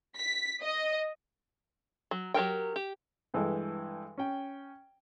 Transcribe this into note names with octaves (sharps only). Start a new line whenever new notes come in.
B6
D#5
F#3
F#3 G4 A#4 G5
G4
G2 E3 G#3 A4
C#4 G5